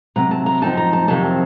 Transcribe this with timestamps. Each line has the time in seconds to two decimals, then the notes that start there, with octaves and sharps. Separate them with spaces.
0.16 C3 F#3 C4 A#5
0.31 A5
0.46 A#5
0.62 F#2 F3 C4 D#4 A5
0.77 A#5
0.93 A5
1.08 F2 C3 D#3 F#3 C4 A5